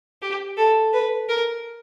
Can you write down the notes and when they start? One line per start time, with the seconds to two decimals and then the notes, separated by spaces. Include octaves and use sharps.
0.22 G4
0.57 A4
0.93 B4
1.29 A#4